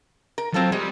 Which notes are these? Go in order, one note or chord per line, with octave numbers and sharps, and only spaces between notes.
A#4
F#3 C4 F4 A4
G3 G#3